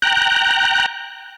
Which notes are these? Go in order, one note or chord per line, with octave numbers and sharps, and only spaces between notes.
G5 A#5 F#6